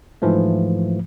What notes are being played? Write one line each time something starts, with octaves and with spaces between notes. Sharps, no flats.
G#2 E3 F3 A3